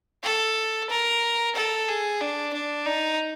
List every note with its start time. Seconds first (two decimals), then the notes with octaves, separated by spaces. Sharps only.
0.24 A4
0.90 A#4
1.56 A4
1.88 G#4
2.21 D4
2.53 D4
2.86 D#4